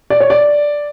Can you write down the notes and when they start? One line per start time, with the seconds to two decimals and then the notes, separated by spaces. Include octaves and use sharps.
0.10 D5
0.21 C#5
0.30 D5